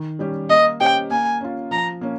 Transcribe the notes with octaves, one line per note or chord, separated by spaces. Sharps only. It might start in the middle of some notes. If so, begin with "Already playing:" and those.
Already playing: D#3
G3 C#4 G4
A#3 D#5
C#4 G4 C5 D#5 G5
A#3 G#5
C#4 F4
F3 A#5
A#3 C#4